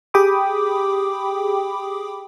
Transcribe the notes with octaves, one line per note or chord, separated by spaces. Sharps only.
G4 G#4 G5 B5 D6 D#6